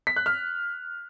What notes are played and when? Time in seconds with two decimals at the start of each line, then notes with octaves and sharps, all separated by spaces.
0.07 B6
0.16 F#6
0.26 F6